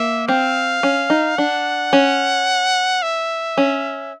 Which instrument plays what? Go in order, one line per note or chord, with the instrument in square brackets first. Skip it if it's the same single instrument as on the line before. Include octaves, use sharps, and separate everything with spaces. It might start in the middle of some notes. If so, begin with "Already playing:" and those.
Already playing: [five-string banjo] A#3 [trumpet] E5
[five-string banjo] C4 [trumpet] F5
[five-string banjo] C#4
D#4
[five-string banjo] D4 [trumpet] F#5
[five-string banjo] C#4
[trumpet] E5
[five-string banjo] C#4